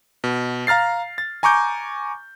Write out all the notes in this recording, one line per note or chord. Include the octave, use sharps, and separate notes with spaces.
B2
F5 A#5 F6 A6 C7
A6
G#5 A#5 C#6 D6 G6